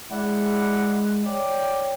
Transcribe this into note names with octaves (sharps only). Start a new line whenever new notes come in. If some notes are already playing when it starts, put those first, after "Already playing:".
G#3 D4 E4 F#5
C#5 D5 G5